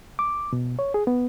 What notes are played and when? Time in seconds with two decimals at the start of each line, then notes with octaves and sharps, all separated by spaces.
0.19 D6
0.53 B2
0.79 C#5
0.94 G#4
1.07 B3